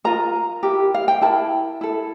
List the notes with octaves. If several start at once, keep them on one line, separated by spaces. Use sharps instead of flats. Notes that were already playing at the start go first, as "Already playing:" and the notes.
F4 A#4 A#5
E4 G4 A#4
F5
G5
E4 A#4 A5
E4 A4